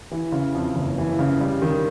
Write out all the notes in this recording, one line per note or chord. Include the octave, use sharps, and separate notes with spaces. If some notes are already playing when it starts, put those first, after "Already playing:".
E3
C#3
F2
F#1
E3
C#3
G3
D#3